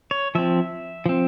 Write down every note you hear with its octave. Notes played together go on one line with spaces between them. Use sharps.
C#5
F3 C4 E5
F3 C4